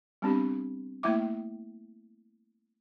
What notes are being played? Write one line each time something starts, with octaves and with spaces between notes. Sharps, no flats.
G3 B3 C4 D4 G4
A3 A#3 E4 E5 D6